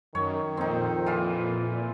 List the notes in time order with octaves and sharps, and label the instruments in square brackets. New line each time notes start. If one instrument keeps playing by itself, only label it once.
[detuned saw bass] F#2 [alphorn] D#3 [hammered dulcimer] C#5
[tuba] F2 [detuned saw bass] A#2 [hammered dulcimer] C4 D#4
[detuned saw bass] A#2 [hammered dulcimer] E3 F4